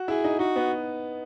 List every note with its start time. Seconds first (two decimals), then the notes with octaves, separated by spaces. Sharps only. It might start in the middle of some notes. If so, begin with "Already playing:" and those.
Already playing: F#4
0.08 E4 G#4
0.24 D#4
0.39 D#4 F#4
0.56 B3